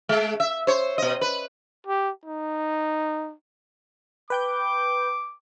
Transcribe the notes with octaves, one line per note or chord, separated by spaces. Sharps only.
G#3
E5
C5 C#5
B2 D#5
B4
G4
D#4
B4 G5 D6 G6